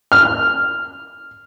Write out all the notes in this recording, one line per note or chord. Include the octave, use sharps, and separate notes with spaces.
F6